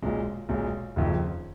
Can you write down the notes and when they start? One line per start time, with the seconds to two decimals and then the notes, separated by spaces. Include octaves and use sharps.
0.02 B1 A#2 G#3
0.49 B1 A#2 G#3
0.96 F#1 F2 D#3